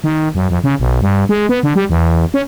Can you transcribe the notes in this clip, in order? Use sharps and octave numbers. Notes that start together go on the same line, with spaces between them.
D#3
F#2
F2
C#3
B1
G2
G#3
B3
D3
G3
E2
C#4